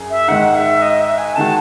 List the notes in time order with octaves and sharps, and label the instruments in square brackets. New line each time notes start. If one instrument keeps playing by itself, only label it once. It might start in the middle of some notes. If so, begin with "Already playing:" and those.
Already playing: [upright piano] F#2 G#4
[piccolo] E5
[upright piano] G#2 D#3 G#3 [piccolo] F#5
[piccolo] E5
D#5
E5
G#5
[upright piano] D#3 G#3 D#4 F#4 [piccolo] A5